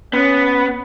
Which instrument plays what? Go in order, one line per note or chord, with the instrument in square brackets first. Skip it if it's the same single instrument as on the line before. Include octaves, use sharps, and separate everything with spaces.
[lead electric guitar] B3 [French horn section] C#4